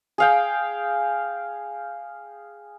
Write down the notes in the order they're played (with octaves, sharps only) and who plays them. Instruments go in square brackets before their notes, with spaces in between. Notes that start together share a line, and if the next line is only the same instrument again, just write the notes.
[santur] G#4 F5 G5